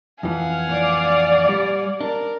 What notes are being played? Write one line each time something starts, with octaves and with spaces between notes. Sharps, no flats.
F2 E3 F5 F#5 G#5
D5
G3
D4 A#4